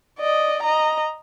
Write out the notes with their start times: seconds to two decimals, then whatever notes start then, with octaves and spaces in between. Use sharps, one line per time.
0.19 D5 D#5
0.63 D#5 A#5